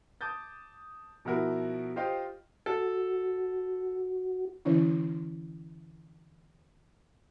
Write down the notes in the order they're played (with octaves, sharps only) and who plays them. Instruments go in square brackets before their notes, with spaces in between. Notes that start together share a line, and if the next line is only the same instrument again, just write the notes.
[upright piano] A5 D6 D#6 G6 A6
B2 F3 E4 F#4 A#4
F4 G4 C5 D#5 F5 G5
[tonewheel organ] F#4 [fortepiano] A4
[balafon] D3 E3 C#4 E4